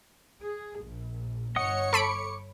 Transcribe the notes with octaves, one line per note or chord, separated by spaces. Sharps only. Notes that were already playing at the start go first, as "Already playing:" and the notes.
G#4
A#1
G1 C#5 D#5 F#5 D#6 C#7
A4 B5 C#6 D6 D7